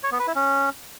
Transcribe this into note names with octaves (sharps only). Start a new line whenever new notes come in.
C#5
B3
B4
E4
C#4